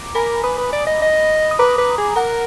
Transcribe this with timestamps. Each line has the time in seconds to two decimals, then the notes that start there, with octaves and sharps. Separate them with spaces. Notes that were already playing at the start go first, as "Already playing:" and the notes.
Already playing: A#5 D6
0.15 A#4 G#5 B5
0.44 B4 B5 D#6
0.58 B4
0.73 D5
0.87 D#5
1.02 D#5
1.51 D#6
1.59 B4 A#5 D6
1.78 B4
1.98 G#4
2.16 A#4 F#5 A#5